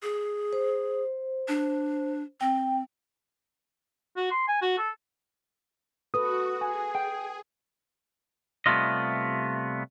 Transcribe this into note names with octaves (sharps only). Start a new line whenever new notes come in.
G#4
C5
D4
C4 G5
F#4
C6
G#5
F#4
A4
F#4 A4 B4 D#6
G#4 G#5
G5
C3 G3 A3 B3 F4 D#5